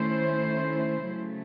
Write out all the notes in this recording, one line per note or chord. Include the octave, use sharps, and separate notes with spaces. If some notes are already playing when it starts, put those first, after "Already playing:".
Already playing: D#3 A3 C#4 E4 C5
C#3 F#3 A3